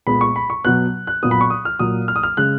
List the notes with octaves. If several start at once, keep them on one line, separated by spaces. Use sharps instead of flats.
A#2 G#3 B3 B5
C#6
B5
C#6
B2 F#3 B3 F#6
F#6
A#2 F#3 B3 D#6
B5
C#6
D#6
F6
A#2 F#3 A#3 D#6
F6
D#6
F6
C#3 G#3 F#6